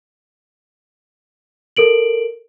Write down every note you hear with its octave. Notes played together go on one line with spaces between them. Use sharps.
A4 A#4 D7 F#7